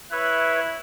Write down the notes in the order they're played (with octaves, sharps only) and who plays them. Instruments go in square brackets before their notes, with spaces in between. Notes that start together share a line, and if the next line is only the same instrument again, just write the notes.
[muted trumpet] E4 [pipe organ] B4 C#5 E5 [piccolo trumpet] F#6